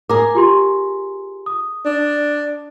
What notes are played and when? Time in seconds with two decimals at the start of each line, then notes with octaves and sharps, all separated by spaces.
0.09 G#4 A#4 D6
0.35 F4 G4 C6
1.46 D#6
1.86 D4